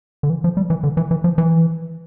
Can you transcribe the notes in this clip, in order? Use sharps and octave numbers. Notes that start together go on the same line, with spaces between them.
D3
E3
F3
G3
E3
D3
E3
E3
F3
E3